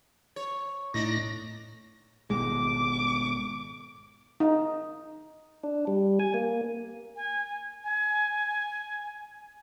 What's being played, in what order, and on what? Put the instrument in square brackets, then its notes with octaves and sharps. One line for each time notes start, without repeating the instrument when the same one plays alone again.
[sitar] C#5
[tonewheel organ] A2 A#6 [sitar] D4 D#4
[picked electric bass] G#1 B2 G#3 [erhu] D6
[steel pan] D#4
[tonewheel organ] D4
G3
G#5
A#3
[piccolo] G#5
G#5